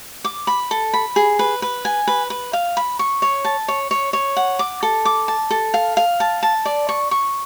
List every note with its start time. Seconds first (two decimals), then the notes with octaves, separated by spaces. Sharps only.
0.24 D6
0.47 B5
0.71 A4
0.93 B5
1.16 G#4
1.39 B4
1.62 B4
1.85 G#5
2.08 B4
2.30 B4
2.53 F5
2.77 B5
2.99 C#6
3.22 C#5
3.45 A5
3.68 C#5
3.91 C#5
4.13 C#5
4.37 F#5
4.59 D6
4.83 A4
5.05 D6
5.28 A5
5.51 A4
5.74 F5
5.97 F5
6.20 A5
6.43 A5
6.65 D5
6.89 C#6
7.11 C#6